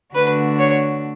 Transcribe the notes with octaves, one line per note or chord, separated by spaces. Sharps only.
D3 A3 D4 F#4 B4
C#5